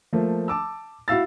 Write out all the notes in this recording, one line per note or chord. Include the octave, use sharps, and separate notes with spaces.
F3 A3 A#3
A5 D6 E6
E4 F#4 E5 F5 E6 A6